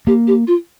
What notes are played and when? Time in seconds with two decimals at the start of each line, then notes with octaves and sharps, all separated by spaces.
0.07 A#3 G4
0.27 G4
0.47 F4